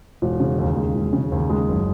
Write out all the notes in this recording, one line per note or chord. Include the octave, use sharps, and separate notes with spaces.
E1
C#3
D#2
G#3
E1
C#3
D#2
G#3
F#1